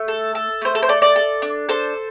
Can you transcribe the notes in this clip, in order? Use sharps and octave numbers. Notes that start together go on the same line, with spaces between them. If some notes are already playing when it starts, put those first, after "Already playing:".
Already playing: A3
A4
A4
A3 C5
A4
C5
A4 D5
D5
A4
D4
A4 C5